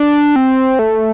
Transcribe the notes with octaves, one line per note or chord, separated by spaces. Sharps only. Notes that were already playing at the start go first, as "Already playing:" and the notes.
Already playing: D4
C4
A3